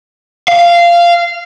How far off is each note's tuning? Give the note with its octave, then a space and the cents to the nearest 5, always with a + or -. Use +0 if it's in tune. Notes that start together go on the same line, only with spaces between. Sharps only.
F5 -15